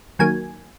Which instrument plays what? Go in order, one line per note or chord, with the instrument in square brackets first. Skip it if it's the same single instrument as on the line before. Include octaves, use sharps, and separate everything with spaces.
[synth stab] D#3 F#3 A#3 G#5